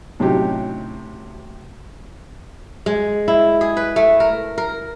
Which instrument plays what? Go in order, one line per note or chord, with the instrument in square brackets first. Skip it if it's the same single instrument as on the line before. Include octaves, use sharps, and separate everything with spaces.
[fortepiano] A2 C3 F#3 C#4 D#4 G4
[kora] G#3
E4
G#4
B4
A3
A#4
A#4